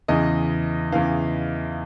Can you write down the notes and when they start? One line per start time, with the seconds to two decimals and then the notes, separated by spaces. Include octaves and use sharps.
0.08 E2 C#3 E3 D#5
0.92 E2 C#3 E3 F5